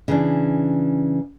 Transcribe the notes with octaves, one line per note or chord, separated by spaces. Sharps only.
C#3 E3 D4